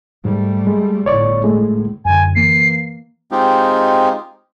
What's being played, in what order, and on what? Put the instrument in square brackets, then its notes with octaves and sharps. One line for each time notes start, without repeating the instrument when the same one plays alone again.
[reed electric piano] G#2 [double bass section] G3 A3
[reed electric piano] G#3
[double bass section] G1 A2 [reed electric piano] C#5 D5 C#6
[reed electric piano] G#3 A3
[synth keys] F#2 D3 [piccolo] G#5
[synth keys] E3 A#3 [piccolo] C7
[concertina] G#3 C4 D#4 F4 G4